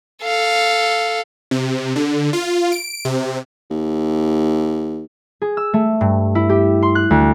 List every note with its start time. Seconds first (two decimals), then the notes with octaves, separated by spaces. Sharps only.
0.23 A4 F5
1.51 C3
1.96 D3
2.33 F4
2.72 D7
3.05 C3
3.70 D#2
5.42 G#4
5.57 E6
5.74 A3
6.01 G2
6.35 E4
6.49 G4
6.82 C6
6.95 F#6
7.10 D2